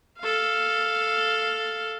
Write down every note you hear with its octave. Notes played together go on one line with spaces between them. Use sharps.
A4 F5